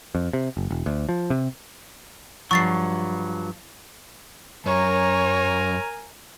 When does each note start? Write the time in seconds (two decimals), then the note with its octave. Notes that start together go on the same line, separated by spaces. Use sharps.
0.15 F2
0.33 C3
0.57 F#1
0.71 E1
0.86 D2
1.09 F3
1.30 C3
2.51 G2 F3 F#3 C#6 A6 C7
4.66 F#2 A#4 C#5 G#5 A#5